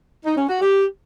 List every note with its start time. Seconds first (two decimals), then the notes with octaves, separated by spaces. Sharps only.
0.25 D#4
0.37 C#4
0.49 F#4
0.61 G4